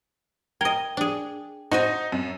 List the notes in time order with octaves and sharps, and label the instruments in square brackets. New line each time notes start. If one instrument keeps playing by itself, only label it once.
[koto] A#4 D#5 [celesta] G5 G#6 G7
[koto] D4 G#4
[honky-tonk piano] D#4 [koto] F#4 C5 G#5
[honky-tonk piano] F#2